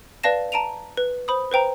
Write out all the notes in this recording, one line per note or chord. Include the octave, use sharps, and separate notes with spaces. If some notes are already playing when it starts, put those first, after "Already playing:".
B4 D5 F5 A5 A#6 E7
A5 A#5 D7 D#7 F7
B4
C5 B5 D#6
B4 C5 G5 A#5